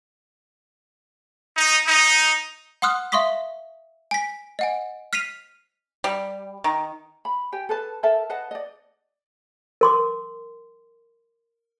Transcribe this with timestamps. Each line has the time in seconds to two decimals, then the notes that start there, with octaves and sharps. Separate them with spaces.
1.56 D#4
1.86 D#4
2.82 F#5 C6 D#6 F6 F#6
3.12 E5 F5 C6 C#6 D#6 B6
4.11 G#5 B6
4.59 D#5 F#5 G#5
5.13 F6 B6 C7 D#7 F7
6.04 G3
6.64 D#3
7.25 B5
7.52 G4 G5 G#5
7.69 A4 B4 A5
8.03 A4 A#4 E5 A5
8.30 B4 D#5 F#5 A5
8.51 D5 D#5
9.81 A#4 C6 D6